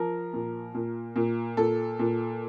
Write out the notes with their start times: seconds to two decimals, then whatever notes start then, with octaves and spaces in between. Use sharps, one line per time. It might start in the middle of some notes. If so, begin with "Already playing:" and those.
Already playing: F3 A#4
0.33 A#2
0.74 A#2
1.16 A#2
1.57 A#2 A4
1.99 A#2